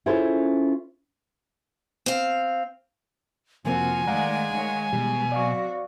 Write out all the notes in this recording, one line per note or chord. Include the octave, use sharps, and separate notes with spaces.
C#4 E4 F4 G#4 A4 C5
C4 F5
F2 C3 F3 A#3 C4 F#4 G#5
D#3 G#3 A3 D5 F5 F#5 A#5
D#3 C#5
B2 E3 G3 G#3
F#3 C4 F#4 D5 F5 C#6